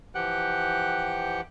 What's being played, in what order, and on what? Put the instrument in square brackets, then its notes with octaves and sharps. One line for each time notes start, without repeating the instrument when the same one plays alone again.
[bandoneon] E3 F3 G4 F#5 G5 F#6